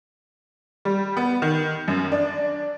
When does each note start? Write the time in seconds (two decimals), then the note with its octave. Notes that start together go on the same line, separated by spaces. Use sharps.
0.85 G3
1.17 B3
1.42 D#3
1.88 F#2
2.12 D4